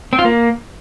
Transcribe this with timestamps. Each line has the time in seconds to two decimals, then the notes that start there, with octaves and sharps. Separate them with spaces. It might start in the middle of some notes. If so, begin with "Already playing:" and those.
0.13 C4
0.19 F4
0.25 A#3